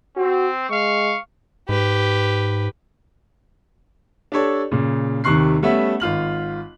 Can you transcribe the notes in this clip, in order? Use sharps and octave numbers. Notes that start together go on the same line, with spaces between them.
C4 F#4
G#3 F5 C#6
G#2 G4 B4
D4 G4 A4 C#5
A#2 C#3
D#2 C3 D#3 C#6 F#6 C7
G3 A3 B3 C#4 E5 F#5
G#1 F4 F6 F#7